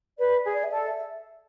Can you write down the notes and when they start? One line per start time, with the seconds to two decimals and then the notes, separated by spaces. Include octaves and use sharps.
0.18 B4 D5
0.45 G#4
0.54 D5
0.64 E5
0.71 A4 D5
0.88 E5